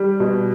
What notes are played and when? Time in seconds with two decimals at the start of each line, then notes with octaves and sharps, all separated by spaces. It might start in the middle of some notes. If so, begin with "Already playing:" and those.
Already playing: G3
0.20 B2